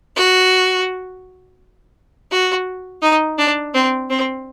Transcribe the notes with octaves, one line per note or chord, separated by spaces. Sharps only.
F#4
F#4
D#4
D4
C4
C4